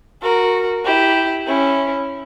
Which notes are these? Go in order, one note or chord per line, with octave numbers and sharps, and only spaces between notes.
F#4 A#4
E4 G4
C#4 E4